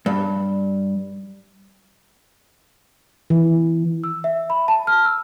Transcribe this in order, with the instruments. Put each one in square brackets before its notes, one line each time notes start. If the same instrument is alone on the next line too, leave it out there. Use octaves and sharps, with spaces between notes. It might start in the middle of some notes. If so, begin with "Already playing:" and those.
[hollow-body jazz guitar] G2
[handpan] E3
[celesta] E6
E5
B5
A5
F6
E6